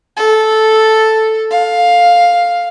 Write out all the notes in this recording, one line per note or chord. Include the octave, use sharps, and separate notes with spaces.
A4
F5